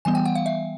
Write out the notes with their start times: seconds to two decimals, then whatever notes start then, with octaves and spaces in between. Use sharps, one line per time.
0.05 E3 G3 B3 G#5
0.15 G5
0.25 F#5
0.35 F5
0.46 E5